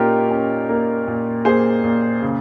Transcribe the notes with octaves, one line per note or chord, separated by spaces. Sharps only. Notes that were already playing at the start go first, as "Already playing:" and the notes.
Already playing: A#2 A#3 C#4 D#4 F4 G4 A#4
C#4
A#3
A#2
A#3 G#4 C5
A#2
C#3